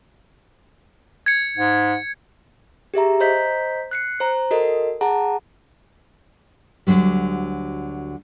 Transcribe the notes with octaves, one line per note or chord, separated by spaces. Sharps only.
G#6 C#7
G#2
G4 G#4 E5 A#5
C5 D#5 A#5 G6 B6
F#6 C7 C#7
C5 A#5
F#4 A4 A#4 D#5
G#4 F#5 A5 A#5
D2 D3 D#3 F#3 G3